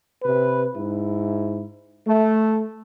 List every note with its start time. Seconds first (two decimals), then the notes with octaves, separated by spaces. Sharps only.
0.23 C3 B4
0.75 G#2 E4
2.07 A3